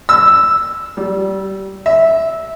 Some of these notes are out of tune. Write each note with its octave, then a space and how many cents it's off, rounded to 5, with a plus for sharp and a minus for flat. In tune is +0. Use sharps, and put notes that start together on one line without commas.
E6 +0
G3 -25
E5 -10